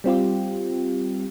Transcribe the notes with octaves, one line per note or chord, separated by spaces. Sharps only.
G3 C4 F4 G4